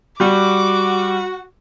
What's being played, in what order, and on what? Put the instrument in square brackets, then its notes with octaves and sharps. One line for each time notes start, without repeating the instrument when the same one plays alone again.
[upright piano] G3 [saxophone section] F#4 [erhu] D6